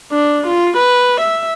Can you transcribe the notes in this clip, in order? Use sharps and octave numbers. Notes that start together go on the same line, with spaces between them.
D4
F4
B4
E5